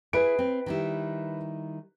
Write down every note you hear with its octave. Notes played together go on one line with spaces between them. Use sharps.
E4 G#4 B4 D7
C4
D#3 G3 E4